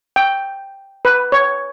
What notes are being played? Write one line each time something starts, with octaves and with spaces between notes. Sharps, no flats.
G5
B4
C#5